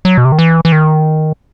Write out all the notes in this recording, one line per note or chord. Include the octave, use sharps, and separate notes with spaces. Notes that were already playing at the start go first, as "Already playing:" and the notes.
F#3
B2
C3
D#3
E3
E3
D#3